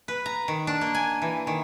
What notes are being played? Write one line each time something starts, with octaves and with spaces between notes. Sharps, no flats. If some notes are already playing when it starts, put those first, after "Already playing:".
B4
A#5
D#3
D4
A#3
G#5
E3
D#3